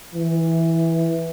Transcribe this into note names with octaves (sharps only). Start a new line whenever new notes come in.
E3